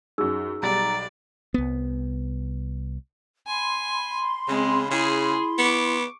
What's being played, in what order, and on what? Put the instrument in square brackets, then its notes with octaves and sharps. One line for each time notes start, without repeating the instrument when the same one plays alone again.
[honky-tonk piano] F#2 F#3 [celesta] D#4 G#4 E6
[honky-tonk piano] B1 G3 A6 [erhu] D5 [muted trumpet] A#5
[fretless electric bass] C2 B3
[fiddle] G#5 [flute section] B5 C6
[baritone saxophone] C#3 [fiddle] G#3 [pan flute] C4
[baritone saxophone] C#3 [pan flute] E4 [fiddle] G#4
[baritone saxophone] B3 [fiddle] C#6 D6